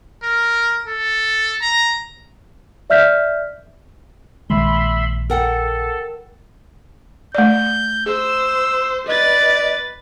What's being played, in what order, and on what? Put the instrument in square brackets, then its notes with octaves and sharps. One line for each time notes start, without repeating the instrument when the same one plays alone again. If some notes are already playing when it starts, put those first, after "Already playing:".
[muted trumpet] A#4
A4
A#5
[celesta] D5 E5 F6 G6 B6
[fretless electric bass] A#1 D#3 G#3 [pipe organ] E5 B5 C6
[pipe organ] A4 [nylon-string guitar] A#4 F#5 G5
[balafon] A3 D5 [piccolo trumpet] G6
[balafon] G#4 [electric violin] C5 [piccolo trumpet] E6
[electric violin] B4 A6 [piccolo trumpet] D5 [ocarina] D#5